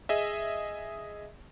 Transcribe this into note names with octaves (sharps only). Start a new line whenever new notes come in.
G#4 D#5 E5